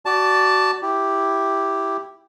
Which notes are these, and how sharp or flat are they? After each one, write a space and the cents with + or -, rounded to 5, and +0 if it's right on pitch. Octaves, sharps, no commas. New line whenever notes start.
F#4 +25 D5 +0 A5 +0
E4 +0 G4 +0